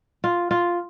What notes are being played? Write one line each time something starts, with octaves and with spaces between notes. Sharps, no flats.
F4
F4